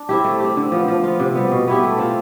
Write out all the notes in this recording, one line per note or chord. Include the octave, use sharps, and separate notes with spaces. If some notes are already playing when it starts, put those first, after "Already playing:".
Already playing: D4
C4 E4 G4
A3
C4 G4
D3
F3 B3
F3
B3 F4
C3
G3 B3
B2
B3 E4 G4
A3
C4 F4 C5